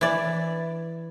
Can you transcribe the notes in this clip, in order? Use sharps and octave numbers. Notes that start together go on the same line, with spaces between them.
E3 D5